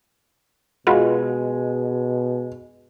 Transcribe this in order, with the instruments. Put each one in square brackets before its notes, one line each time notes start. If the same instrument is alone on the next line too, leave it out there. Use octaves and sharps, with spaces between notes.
[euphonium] B2 [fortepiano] G#3 [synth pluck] F4 F#4 B4